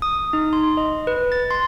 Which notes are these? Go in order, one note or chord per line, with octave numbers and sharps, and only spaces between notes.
D#6
D#4
C6
D#5
B4
A6
C6